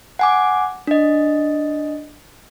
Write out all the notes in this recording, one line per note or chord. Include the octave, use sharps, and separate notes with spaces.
F#5 G#5 D6
D4 D#5